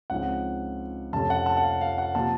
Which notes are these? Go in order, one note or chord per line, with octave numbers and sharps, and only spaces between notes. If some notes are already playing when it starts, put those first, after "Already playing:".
C#2 C#3 F3 C4 D#4 F#5
F2 C3 F3 A3 C#4 A5
F#5
A5
F#5
F5
F5
F#5
C3 F3 A#3 A5